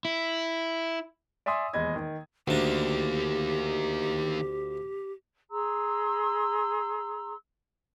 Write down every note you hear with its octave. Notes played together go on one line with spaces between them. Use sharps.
E4
D5 E5 G#5 C6 D#6 E6
D#1 E2 G#3 D#5 B5 G#6
D#3
D2 D#3 A#3 D4 G4
G#4 A#5 C6 E6